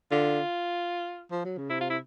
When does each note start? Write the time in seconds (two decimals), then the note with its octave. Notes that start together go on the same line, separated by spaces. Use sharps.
0.11 D3 F4
1.31 F3
1.45 F#3
1.57 C#3
1.70 C3 E4
1.81 F4
1.90 E4